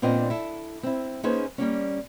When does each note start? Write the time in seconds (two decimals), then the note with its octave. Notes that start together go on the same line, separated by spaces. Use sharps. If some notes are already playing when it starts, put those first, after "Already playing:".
0.02 A#2 B3 C4 D4 A#4 D#5
0.30 E4 A4
0.83 C4 E4
1.23 A#3 C#4 D#4 G#4 B4 C5
1.58 G3 A#3 C#4